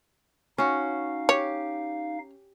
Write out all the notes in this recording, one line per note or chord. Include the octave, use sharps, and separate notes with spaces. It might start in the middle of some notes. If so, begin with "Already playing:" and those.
C#4 D#4 F#4 F5
G4 C#5